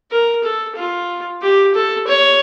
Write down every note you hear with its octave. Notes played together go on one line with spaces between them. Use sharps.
A#4
A4
F4
G4
A4
C#5